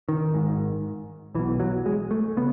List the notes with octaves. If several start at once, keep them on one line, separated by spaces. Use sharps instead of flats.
D#3
G#1 G#2
B1 B2 E3
F#3
G#3
A3
C#3 B3